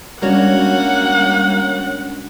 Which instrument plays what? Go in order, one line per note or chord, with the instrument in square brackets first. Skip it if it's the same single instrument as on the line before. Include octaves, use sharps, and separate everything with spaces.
[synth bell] G3 F#4 C#5 [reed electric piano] G#3 C#4 D4 [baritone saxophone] A#3 [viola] F#5